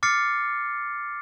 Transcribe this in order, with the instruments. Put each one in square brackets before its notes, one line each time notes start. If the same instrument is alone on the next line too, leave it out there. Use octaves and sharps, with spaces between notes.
[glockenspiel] D6 F6 A6 C7 C#7